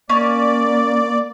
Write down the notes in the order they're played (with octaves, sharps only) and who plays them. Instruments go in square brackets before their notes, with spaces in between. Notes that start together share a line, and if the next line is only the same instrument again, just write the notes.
[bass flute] A#3 [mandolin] C#4 [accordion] D5